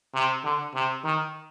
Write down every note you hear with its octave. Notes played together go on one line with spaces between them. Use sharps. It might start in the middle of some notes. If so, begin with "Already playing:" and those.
C3
D3
C3
D#3